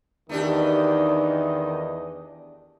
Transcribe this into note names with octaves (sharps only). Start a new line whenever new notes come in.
E2 D#3 A3 D4 G4 D#5